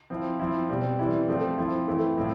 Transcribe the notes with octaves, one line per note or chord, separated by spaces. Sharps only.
F3 C4 E4
F3 C4 E4
B2 G3 C4
E3 G3 C4 E4
F3 A3 C4
F3 C4 E4
E3 A3 C4 E4
A2 F3 C4 E4